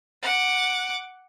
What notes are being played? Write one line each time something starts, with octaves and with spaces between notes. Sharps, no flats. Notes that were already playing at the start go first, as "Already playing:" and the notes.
F#5 D6